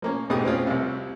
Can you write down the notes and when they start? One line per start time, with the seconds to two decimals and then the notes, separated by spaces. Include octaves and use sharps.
0.02 F3 A#3 C#4
0.30 G#2 B2 G#3 A3 G4 D#6
0.44 B2 C4 C#4 F4
0.67 C2 C3